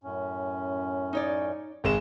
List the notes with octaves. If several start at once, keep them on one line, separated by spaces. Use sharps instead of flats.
F#2 A2 C#4
D#4 C#5 D5
G#1 G#3 E7